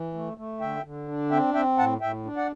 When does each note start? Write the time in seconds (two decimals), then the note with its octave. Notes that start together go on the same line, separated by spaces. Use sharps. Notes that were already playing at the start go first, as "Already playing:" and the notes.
Already playing: E3
0.14 A3
0.37 A3
0.60 D3 E5 G5
0.84 D3
1.08 D4
1.31 C4 E5 G5
1.54 C4 E5 G5
1.78 A2 F#5 A5
2.01 A2 E5 G5
2.25 D4
2.36 D5 F#5